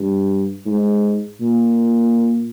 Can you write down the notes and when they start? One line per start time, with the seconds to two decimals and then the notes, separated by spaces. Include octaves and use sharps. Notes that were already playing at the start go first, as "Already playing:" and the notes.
Already playing: G2
0.66 G#2
1.41 A#2